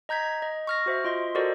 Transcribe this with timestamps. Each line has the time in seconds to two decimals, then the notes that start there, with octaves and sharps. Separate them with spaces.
0.09 D#5 A#5 G6 G#6 B6
0.42 D#5
0.67 C#6 F6 A#6
0.86 F#4 C5 E5
1.05 F4 D#5 C6
1.35 F#4 A4 A#4 C5 D5 D#5